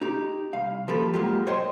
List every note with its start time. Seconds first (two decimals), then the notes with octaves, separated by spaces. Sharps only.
0.01 D#4 G4
0.53 C2 F5
0.88 F3 A#3 G4 A4 B4
1.14 G#2 F#3 G#3 A#3 F4 G4
1.47 C5 C#5 D#5 G5 C6